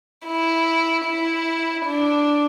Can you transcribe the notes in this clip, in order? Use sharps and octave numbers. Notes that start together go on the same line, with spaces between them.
E4
E4
D4